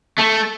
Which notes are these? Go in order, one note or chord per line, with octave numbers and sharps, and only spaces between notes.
A3